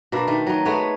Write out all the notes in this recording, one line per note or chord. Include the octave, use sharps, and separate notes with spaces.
B2 A#3 D4 E5
D#3 A3
F#3 D#4
G#3 A3 B3 C#5